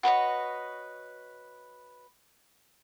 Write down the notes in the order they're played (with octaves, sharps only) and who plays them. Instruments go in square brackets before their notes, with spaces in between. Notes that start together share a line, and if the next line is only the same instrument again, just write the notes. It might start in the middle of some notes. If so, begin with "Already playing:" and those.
[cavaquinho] F#4 B4 C#5 D#5